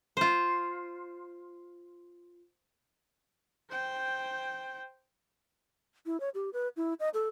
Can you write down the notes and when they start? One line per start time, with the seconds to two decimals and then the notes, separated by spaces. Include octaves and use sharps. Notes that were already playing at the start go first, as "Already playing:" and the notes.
0.17 F4 C5
3.70 C5 G5
6.06 E4
6.20 C#5
6.35 G4
6.53 B4
6.76 E4
7.00 D#5
7.14 A4